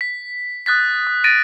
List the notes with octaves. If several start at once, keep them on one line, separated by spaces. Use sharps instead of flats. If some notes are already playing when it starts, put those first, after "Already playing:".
B6
D#6 F#6 A6 B6
D#6
A6 A#6 D7 D#7